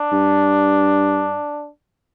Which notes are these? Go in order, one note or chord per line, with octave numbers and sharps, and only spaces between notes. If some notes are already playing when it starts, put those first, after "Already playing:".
Already playing: D4
G2